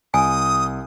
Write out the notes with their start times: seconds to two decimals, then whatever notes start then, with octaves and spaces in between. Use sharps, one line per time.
0.14 C2 G#5 D#6